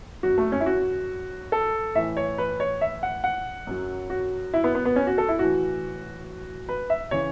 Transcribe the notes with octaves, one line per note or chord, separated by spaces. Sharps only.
F#2 F#3 F#4
A3
C#4
E4
F#4
A4
A2 E3 E5
C#5
B4
C#5
E5
F#5
F#5
F#2 F#3
F#4
E4
B3
B3
B3
C#4
F#4
A4
E4
A2 E3 F#4
B4
E5
C#3 E3 C#5